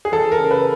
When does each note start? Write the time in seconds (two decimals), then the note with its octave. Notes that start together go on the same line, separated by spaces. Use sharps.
0.05 G#4
0.12 E3 A4
0.32 A#4
0.38 C#3
0.51 B4